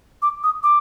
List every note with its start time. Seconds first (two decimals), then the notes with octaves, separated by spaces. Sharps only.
0.22 D6
0.44 D#6
0.63 D6